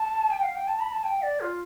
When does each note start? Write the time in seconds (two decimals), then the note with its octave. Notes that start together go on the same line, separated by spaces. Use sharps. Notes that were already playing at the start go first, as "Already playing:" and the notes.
Already playing: A5
0.30 G5
0.43 F5
0.55 G5
0.67 A5
0.80 B5
0.92 A5
1.04 G5
1.22 D5
1.41 F4